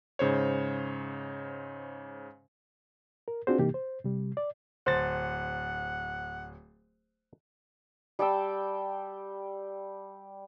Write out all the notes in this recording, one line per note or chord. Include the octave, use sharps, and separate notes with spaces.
G#2 C#3 C5 C#5
A#4
C4 D4 F4 F#4 G#4 C5
C3 E3 A#3 D#4 G4
C5
C3 G3
D5
D1 C5 F#5 A6
G3 G5 A5 E6